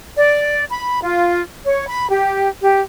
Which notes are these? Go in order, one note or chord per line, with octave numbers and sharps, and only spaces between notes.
D5
B5
F4
C#5
B5
G4
G4